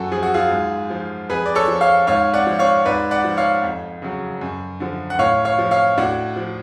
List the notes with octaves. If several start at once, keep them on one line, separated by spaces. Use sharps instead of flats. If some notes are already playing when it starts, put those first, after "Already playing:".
Already playing: F#2 F#4 A4
F3 G#4
F#4
F4 G#4
G#2
F3
F2 G#4 B4
D5
A4 C#5
F3
C#5 F5
G#2 C#5 F5
D5 F#5
F3
C#5 F5
G#2 B4 D5
D5 F#5
F3
C#5 F5
F2
C#3 F#3
F#2
D3 F3
F#5
A2 C#5 F5
C#5 F5
F3
C#5 F5
A2 D4 F#4
F3